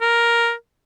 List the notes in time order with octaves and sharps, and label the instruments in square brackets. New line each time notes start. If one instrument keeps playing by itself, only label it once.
[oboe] A#4